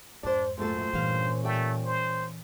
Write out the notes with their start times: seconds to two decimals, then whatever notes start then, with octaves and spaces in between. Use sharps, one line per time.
0.23 F2 G#2 D4 C5 D5
0.58 F#2 A#2 A3 A4 C5
0.93 G2 A#2 E3 C#4 F5
1.44 G3 A3 D5 G5
1.85 C5